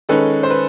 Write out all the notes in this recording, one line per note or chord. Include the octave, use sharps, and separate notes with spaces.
D#3 G#3 C#4 A4 B4
C5
B4